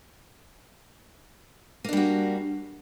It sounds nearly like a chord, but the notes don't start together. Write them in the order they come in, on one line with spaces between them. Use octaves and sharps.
A#3 D4 G3 F#4